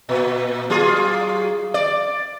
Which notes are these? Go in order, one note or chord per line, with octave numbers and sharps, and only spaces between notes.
A#2
F#3 F4 G#4
D5